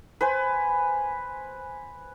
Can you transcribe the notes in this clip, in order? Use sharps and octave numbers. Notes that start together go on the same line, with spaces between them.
B4 C5 G#5